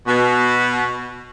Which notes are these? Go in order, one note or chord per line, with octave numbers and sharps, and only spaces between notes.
B2